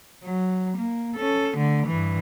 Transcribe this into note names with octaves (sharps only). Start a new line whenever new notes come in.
F#3
A#3
C#4 A4
D3 A3
G2 E3